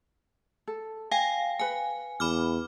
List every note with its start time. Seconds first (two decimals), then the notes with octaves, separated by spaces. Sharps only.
0.68 A4
1.11 F5 G5 G#5
1.59 B4 F5 G#5
2.20 E2 B5 D6 F6